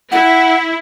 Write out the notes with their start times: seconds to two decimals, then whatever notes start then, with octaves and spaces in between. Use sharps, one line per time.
0.12 E4 F#5